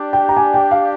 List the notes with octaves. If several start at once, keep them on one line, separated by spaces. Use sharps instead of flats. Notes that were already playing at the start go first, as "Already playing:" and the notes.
Already playing: D4 G4 D5
G5
A#5
G#5
G5
F5